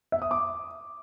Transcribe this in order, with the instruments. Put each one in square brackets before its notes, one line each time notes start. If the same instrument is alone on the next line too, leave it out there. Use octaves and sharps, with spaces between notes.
[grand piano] E5
D#6
D6